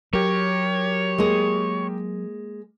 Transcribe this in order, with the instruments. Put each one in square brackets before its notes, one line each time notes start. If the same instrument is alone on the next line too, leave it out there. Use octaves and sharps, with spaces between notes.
[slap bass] F#3 [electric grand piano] G4 A#4 [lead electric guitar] C#5
[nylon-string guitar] G#3 A#3 G#4